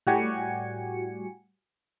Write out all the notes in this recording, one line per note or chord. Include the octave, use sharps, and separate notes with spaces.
A2 G3 F#4 G4 G#5 C#7